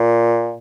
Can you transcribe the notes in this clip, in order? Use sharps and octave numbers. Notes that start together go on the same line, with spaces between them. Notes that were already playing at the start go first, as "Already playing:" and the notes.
Already playing: A#2